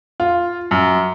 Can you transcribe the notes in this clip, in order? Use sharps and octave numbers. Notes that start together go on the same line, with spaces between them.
F4
F#2